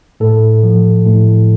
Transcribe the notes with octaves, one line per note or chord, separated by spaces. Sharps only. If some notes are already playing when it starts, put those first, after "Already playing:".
A2 A4
F3
A2